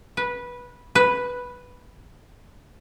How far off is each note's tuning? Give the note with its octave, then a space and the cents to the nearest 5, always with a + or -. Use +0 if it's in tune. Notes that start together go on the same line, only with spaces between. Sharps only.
B4 -15
B4 +0